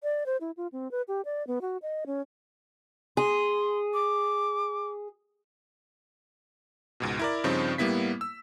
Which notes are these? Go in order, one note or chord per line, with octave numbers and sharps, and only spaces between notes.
D5
C5
E4
F4
C4
B4
G4
D5
B3
F#4
D#5
C#4
G#4 C6
D6
C#2 G#2 B2
E4 A#4 D5
G2 C#3 F3 C4 D#4
A2 G3 A#3 B3 E4 B6
E6